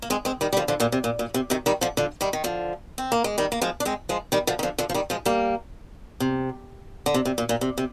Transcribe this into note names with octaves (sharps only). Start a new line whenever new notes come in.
A#3
G#3 C4
G#3 C4
D#3 G3
G3
D3 F3
D3 F3
A#2 D3
C3
A#2
A#2
C3
C3 D#3
D#3 G3
D3 F3
D3 F3
D#3 G3
D#3
D3 F3
C4
A#3
G#3
D#3 G3
A#3
F3 G#3
D4
G#3 C4
F3 G#3
D#3 G3
D3 F3
D#3
D3 F3
D3 F3
F3
D#3 G3
F3 G#3
G3 A#3
C3
D3
C3
C3
A#2
A#2
C3
C3